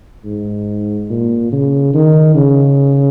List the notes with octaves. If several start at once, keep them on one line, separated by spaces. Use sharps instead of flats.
G#2
A#2
C#3
D#3
C#3